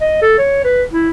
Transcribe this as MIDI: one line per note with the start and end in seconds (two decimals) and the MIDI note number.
0.01 0.21 75
0.22 0.36 69
0.38 0.62 73
0.64 0.83 71
0.93 1.10 64